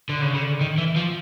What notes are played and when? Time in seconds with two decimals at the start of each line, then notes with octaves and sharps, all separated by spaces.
0.09 D3
0.22 C#3
0.34 D3
0.61 D#3
0.78 E3
0.96 F3